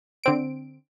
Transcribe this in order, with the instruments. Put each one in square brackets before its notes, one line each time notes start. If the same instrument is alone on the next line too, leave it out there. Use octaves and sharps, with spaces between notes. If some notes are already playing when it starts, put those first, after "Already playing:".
[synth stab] D3 C4 D7